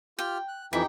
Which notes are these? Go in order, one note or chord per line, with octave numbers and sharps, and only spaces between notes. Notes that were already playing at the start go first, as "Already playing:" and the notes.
F4 G4 G5 F6
F#6
F2 E3 D#4 E4 G4 G5